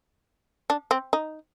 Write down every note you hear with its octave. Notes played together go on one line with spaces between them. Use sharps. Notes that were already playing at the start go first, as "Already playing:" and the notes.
D4
C4
D#4